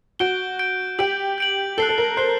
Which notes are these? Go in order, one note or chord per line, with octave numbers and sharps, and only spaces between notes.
F#4 G6 D7 G7
G6 D7 G7
G4 G6 D7 F#7
G6 D7 F#7
A4 F#6 C7 G7
A4
A#4
C5 F#6 C7 G7